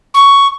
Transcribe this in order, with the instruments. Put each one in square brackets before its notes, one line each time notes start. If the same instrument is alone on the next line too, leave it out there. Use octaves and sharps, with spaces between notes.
[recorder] C#6